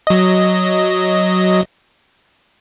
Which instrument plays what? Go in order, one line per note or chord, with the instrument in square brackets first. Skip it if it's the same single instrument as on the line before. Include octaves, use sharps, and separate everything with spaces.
[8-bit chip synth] F#3 D#5